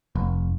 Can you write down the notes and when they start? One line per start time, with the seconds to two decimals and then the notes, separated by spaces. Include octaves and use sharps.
0.15 F1